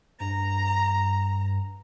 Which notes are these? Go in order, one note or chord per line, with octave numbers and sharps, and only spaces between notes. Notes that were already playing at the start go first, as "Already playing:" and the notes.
G2 A#5